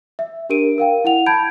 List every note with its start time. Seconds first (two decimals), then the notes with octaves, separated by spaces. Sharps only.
0.19 E5
0.50 D4 G4 A#4 D7 D#7
0.78 A#4 F5 G5
1.04 E4 F#5 F7
1.26 A5 B5 G6 G#6 D7